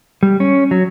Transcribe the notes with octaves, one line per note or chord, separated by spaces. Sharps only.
G3
C#4
F#3